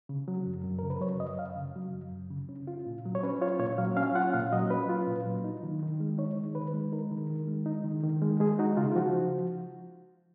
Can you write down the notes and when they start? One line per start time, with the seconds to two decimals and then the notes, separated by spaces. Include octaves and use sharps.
0.09 C#3
0.28 F#3
0.47 F#2
0.64 F#2
0.79 C#3 A#4
0.90 B4
1.01 F#3 C#5
1.20 F#2 D#5
1.38 F#2 F5
1.56 C#3
1.76 F#3
1.94 F#2
2.12 F#2
2.30 C#3
2.49 C#4
2.67 F4
2.86 A#2
3.05 F#3
3.15 C#5
3.23 C#4 B4
3.42 F4 C#5
3.60 A#2 C#5
3.78 F#3 F5
3.97 C#4 F5
4.15 F4 F#5
4.34 A#2 F5
4.52 F#3 D#5
4.70 C#4 B4
4.89 F4
5.07 A#2
5.26 F#3
5.44 D#4
5.63 D#3
5.82 D#3
6.00 G#3
6.18 D#4 C#5
6.37 D#3
6.55 D#3 B4
6.74 G#3
6.92 D#4 A#4
7.12 D#3
7.30 D#3
7.48 G#3
7.66 D#4
7.84 D#3
8.03 D#3
8.22 G#3
8.40 G#3 G#4
8.59 D#4 F#4
8.77 C#3 F4
8.92 F4
8.96 F3 F#4